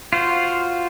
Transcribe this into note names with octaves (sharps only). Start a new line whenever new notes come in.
F4 F#4 C5